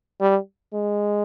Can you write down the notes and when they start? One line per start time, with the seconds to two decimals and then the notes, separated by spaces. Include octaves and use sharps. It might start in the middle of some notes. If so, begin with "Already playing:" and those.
0.21 G3
0.73 G#3